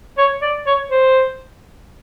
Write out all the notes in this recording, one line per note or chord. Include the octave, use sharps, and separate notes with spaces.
C#5
D5
C#5
C5